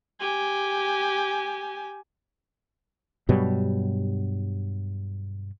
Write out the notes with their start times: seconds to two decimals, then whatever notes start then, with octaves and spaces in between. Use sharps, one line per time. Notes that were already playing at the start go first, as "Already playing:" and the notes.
0.20 G4 G#5
3.29 G2 B2 F#3 G3